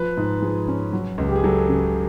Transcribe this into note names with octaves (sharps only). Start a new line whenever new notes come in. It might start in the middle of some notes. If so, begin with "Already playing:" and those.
Already playing: F3 B4
G#2
F3 G#4
C#4
F#3
C#2
G4
G#4
F#3 A4
C#3